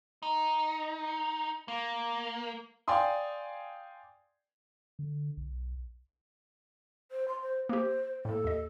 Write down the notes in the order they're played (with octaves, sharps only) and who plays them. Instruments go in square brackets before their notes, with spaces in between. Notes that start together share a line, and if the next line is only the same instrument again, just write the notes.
[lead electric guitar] D#4
A#3
[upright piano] D5 F5 G5 G#5 C6 D#6
[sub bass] D3
B1
[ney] C5
C6
C5
[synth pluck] A#3 G4 [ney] C5
[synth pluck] A2 A#3 [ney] A4
[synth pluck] D#2 D#5